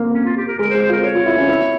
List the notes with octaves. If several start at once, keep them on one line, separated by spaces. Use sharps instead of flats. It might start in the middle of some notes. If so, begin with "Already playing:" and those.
Already playing: A#3 C4
C#4
F4
G4
A#4
G#3 A#4
C5
G#3
C5
F4 A#4
C#5
F4
E4
C#4
E4